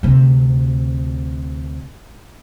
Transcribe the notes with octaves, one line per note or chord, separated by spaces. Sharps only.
D2 C3